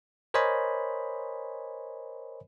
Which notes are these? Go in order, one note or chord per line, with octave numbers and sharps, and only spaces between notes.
A#4 C5 C#5 D#5 G#5 B5